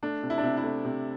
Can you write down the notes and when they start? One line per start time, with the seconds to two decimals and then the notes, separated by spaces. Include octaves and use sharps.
0.03 A3 D4
0.23 C3
0.30 E4
0.38 D4
0.43 C3 E4
0.57 E4
0.64 A3
0.85 C3